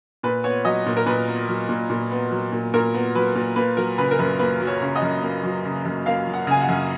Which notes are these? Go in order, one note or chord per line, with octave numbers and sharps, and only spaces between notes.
A#2 B4
B3 C#5
F#3 D#5
A#2
A#4
A#2 B4
B3
F#3
A#2
A#2
B3
F#3
A#2
A#2 A#4
B3
F#3 B4
A#2
A#3 B4
F#3 A#4
C#3 B4
A#4
F#2 B4
A#3 B4
F#3
C#5
C#3
D#5
F#2
A#3
F#3
C#3
F#2
A#3 F5
F#3
F#5
C#3 G#5
F#5
F#2